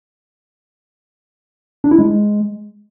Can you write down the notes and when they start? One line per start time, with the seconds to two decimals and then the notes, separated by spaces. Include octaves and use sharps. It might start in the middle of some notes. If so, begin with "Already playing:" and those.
1.84 D4
1.91 E4
1.98 G#3